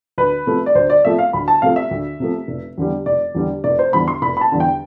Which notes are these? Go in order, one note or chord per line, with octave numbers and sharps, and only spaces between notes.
D2 B4
C3 F3 A3
D5
D2 C5
D5
C3 F3 A3 E5
F5
D2 B5
A5
C3 F3 A3 F5
E5
D2
C3 F3 A3
F1
E2 D3 G3
F1 D5
E2 D3 G3
F1 D5
C5
E2 D3 G3 B5
C6
F1 B5
B5
A5
E2 D3 G3
G5